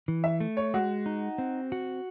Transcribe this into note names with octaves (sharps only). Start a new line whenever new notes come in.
E3
E5
A3
C#5
G#3 F#4
D#4
C4
F#4